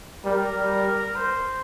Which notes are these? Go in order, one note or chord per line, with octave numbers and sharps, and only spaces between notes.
G3 A#4
G3
A#4
C5